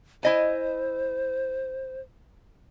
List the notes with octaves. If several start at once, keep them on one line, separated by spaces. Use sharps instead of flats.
E4 C5 D#5 G#5